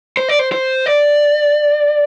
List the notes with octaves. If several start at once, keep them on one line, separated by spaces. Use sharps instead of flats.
C5
D5
C5
C5
D5